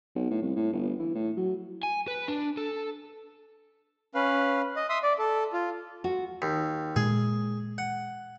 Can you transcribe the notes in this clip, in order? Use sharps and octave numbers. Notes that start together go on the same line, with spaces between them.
B1
A2
C2
A2
G1
E3
A2
F#3
G#5
B4
D4
A4
C#4 B4 F5
D#5
E5 C6 D#6
D5
A4
F4
F#4
D#2
A#2 G#3 G#4
F#5